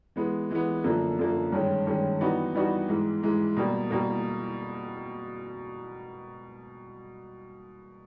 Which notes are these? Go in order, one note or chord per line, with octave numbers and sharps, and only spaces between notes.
E3 G#3 B3
E3 G#3 B3
F#2 D3 F3 A#3
F#2 D3 F3 A#3
G2 D#3 G#3 C#4
G2 D#3 G#3 C#4
E3 G3 B3 D#4 F#4
E3 G3 B3 D#4 F#4
G#2 E3 G#3
G#2 E3 G#3
B2 G3 A#3
B2 G3 A#3